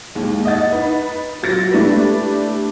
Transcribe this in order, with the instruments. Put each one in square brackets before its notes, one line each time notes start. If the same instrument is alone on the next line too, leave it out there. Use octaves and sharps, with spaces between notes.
[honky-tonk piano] D#2 G#3
D#5 F#5 A6
D#4 B4
F#3 F4 A6 A#6 C#7
A3 D4 E4 G4 B4